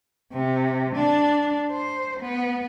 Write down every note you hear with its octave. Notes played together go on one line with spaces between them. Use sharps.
C3
D4
C5
B3